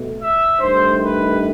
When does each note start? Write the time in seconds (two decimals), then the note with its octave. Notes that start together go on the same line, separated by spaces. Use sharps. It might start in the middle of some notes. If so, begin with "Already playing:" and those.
Already playing: B2 A3
0.19 E5
0.59 G2 D#3 A3 C5
1.00 B4